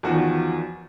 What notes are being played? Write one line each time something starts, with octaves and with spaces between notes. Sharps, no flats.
E2 D#3 F3 F#4